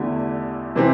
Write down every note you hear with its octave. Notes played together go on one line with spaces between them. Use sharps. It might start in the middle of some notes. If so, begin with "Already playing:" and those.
Already playing: E2 D3 A3 E4 G4
C3 E3 C4 G4